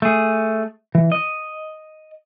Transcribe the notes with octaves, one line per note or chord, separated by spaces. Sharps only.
A3 G#4
E3
D#5